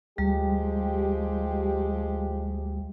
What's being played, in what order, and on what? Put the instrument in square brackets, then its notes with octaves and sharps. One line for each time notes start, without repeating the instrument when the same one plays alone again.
[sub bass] D2 [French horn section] F3 G#3 G4 [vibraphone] G3